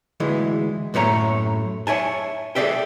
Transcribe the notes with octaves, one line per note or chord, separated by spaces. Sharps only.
D2 E3 G#3
F#2 A2 A3 C#5 A#5
C#5 E5 G#5 A5
G#4 A4 C5 D5 E5 G5